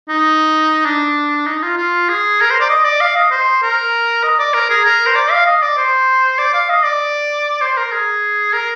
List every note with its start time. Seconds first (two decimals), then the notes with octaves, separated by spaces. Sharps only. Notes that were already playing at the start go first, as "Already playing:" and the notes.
0.09 D#4
0.86 D4
1.47 D#4
1.63 F4
1.78 F4
2.09 G#4
2.41 A#4
2.50 C5
2.60 D5
2.70 D#5
2.85 D5
3.01 F5
3.16 D#5
3.31 C5
3.62 A#4
4.23 D#5
4.39 D5
4.54 A#4
4.70 G#4
4.85 A#4
5.06 C5
5.15 D5
5.31 F5
5.46 D#5
5.62 D5
5.77 C5
6.38 D5
6.54 F5
6.69 D#5
6.85 D5
7.61 C5
7.77 A#4
7.92 G#4
8.54 A#4